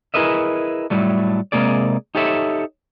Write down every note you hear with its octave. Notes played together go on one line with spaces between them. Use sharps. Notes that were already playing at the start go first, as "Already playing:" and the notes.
E4 G#4 A#4 B4 D#5 E5
A2 F#3 G3 A3
C3 G#3 A#3 G#4 D5
D#4 G4 A4 C#5 E5